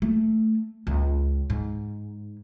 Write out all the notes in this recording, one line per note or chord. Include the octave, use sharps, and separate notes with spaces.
A3
C#2
G#2